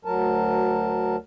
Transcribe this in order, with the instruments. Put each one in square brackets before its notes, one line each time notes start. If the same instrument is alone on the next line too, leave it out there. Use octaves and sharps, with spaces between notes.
[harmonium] D2 F#3 A#4 A5